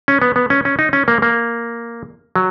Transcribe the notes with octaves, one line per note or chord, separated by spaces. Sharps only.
C#4
B3
B3
C#4
C#4
D#4
C#4
A#3
A#3
F#3